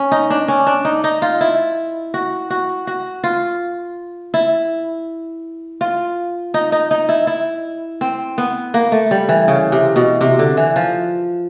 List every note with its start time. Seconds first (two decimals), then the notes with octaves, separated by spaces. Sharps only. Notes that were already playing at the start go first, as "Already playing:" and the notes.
Already playing: C#4
0.12 D#4
0.30 D4
0.48 C#4
0.67 D4
0.85 D#4
1.04 D#4
1.22 F4
1.41 E4
2.14 F#4
2.50 F#4
2.87 F#4
3.24 F4
4.34 E4
5.81 F4
6.54 D#4
6.72 D#4
6.91 D#4
7.09 E4
7.27 E4
8.01 C4
8.38 B3
8.74 A#3
8.92 A3
9.11 G3
9.29 E3
9.48 C#3
9.72 C3
9.96 B2
10.21 C3
10.39 D3
10.57 E3
10.76 F3